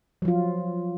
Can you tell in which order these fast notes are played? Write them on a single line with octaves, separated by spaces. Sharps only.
F#3 F3 F4